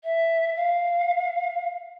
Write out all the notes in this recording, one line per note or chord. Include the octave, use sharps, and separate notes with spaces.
E5
F5